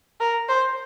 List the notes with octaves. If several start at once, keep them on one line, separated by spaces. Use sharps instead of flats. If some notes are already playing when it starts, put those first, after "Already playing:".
A#4
C5